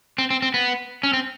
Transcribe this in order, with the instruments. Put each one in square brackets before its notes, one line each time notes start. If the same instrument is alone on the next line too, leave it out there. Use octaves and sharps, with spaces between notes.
[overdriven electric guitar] C4
C4
C4
B3
C#4
C4